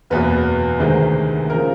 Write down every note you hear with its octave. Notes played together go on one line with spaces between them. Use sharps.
F#1 E2 B2 B4
D2 C3 D#3 G#3
C#3 F3 A#4